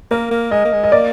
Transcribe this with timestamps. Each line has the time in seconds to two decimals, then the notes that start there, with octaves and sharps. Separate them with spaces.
0.11 A#3 A#4
0.31 A#3
0.51 G#3 D#5
0.65 A#3
0.73 G#3
0.83 D#5
0.92 A#3 D5